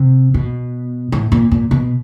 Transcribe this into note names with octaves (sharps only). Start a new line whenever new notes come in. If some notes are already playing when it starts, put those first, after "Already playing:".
Already playing: C3
B2
A2
A#2
A#2
B2